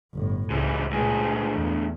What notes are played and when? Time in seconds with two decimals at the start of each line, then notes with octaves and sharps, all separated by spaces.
0.14 G1 A2
0.50 C#2 G#2 E3
0.91 D2 A#2 G#3 G#4
1.55 E2